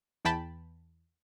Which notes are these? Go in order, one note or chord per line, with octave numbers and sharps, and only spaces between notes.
E2 E3 G5 A5 B5